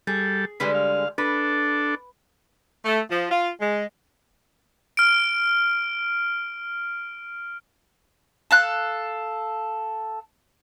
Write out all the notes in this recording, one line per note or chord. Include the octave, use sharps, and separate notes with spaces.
G3 G#4 A4
D3 G3 G#3 B4
F5
D4 A4 B4
A3
F3
F4
G#3
F6 D7
A4 F5 F#6